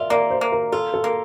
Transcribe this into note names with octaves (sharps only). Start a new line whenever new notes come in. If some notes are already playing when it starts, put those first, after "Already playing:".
Already playing: F4 A#4 D5 E5
A#3 D5
C5
A#3
A#4
F4 A4
A4
A#3